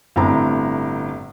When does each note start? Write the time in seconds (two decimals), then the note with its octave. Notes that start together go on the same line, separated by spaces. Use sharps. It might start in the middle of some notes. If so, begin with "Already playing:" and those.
0.16 G1 A2 C4 A#5